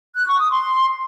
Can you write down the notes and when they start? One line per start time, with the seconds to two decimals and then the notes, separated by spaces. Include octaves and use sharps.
0.16 F#6
0.28 C#6
0.40 D#6
0.51 C6